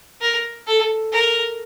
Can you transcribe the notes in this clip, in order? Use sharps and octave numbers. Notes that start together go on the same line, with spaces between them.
A#4
A4
A#4